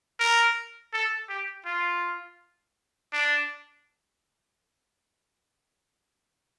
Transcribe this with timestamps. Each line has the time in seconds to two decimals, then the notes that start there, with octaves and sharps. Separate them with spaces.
0.20 A#4
0.93 A4
1.29 G4
1.66 F4
3.13 D4